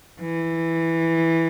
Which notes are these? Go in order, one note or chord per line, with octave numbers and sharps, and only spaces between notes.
E3